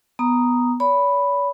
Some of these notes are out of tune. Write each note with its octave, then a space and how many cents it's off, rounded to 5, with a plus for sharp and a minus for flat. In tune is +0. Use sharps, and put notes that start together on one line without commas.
B3 +0 A#5 +0 D#6 +0
C#5 +45 B5 +0